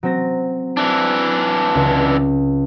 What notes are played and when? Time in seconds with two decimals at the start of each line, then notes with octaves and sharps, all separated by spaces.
0.03 F#3 C4 A#6
0.77 E3 D4
1.75 C#2 E6